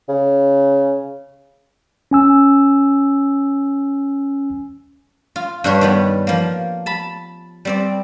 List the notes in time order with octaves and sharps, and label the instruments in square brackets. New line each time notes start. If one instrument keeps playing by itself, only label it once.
[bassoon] C#3
[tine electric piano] C#4 G#5 E6
[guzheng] F4
G2 D4 G4 C#5
D#3 G3 B3
F3 A#3
A5 B5
G3 C4 D5